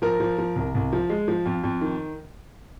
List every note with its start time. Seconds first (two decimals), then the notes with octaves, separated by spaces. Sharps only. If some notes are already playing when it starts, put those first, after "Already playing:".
0.02 F3 A#4
0.20 F3
0.38 F3
0.56 C2
0.75 C2
0.93 F3
1.10 G#3
1.28 F3
1.46 F2
1.64 F2
1.81 D#3